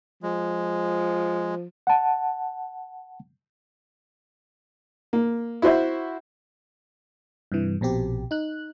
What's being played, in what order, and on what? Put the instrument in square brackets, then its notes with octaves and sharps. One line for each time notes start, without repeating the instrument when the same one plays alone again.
[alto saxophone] F3 [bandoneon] G#3
[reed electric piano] F#5 A5
[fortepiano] A#3
E4 F#4 C5 E5
[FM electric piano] G2 C3 E3
A#1 B2 C4 G4
D#4 F#6